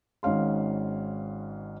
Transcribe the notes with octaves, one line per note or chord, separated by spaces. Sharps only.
G#1 G#2 C#4 F5 C6